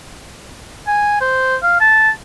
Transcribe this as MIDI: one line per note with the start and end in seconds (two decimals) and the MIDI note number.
0.87 1.18 80
1.21 1.56 72
1.63 1.76 77
1.81 2.10 81